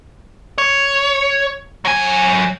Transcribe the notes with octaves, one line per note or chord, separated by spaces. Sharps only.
C#5
F#3 G#5